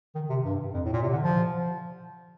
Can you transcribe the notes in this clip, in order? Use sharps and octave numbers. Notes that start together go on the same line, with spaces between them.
D#3
C3
G2
F2
A2
A#2
C3
D3
F3